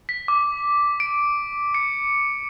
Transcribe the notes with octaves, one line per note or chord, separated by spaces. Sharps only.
B6
D6
D7
C#7